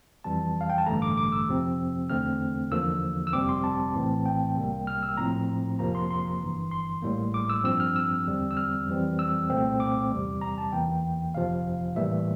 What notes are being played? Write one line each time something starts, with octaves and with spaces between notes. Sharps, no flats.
F2 E3 G3 A5
F5
G5
A5
A1 G2 D3 A3 A#5
D6
D6
E6
F2 C3 F3 C4
E2 D3 A3 C4 F6
E2 D3 F3 A#3 E6
E6
G1 F2 C3 G3 C4 D6
C6
A5
A#1 A2 E3 A3 C4
G5
C2 C3 G3 A#3
F6
E6
A2 F3 C4 A#5
G1 F2 C3 F3 A#3 A#5
C6
C6
G1 G2 E3
C6
A1 A2 G3 A#3
D6
E6
G2 F3 C4 E6
F6
E6
E2 D3 G3 C4
E6
F6
F2 E3 G3 C4
E6
C2 A#2 A3 C4
D6
E2 C3 G3
A#5
A5
E2 E3 A#3 G5
G1 F2 C3 F3 F5
A2 E3 G3 A#3 E5